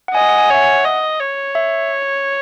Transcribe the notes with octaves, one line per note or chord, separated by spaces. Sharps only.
F#5
D#5 G#5
F#5
G#5
C#5 E5
F#5
D#5
C#5
E5